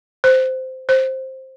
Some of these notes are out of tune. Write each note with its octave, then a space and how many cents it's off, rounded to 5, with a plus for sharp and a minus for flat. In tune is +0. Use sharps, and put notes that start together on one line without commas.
C5 -10
C5 +10